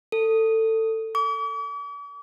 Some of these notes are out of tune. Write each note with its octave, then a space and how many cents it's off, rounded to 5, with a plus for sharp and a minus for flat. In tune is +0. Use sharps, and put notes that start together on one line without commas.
A4 +20
D6 -45